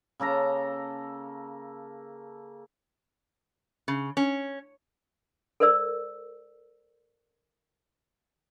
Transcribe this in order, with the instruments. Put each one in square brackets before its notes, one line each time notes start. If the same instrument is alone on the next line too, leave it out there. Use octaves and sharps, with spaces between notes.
[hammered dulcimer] C#3 A#3 A4 A#5
[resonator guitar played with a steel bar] C#3
C#4
[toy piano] A4 A#4 C5 D5 E6